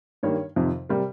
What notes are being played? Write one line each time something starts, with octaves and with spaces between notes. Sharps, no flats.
G2 D#3 G3 A#3 C#5
F2 C3 D#3
C3 G3 A#4